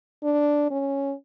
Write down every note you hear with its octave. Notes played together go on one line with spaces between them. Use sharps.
D4
C#4